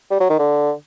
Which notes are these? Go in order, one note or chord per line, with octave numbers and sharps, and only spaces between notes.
G3
F#3
D#3
D3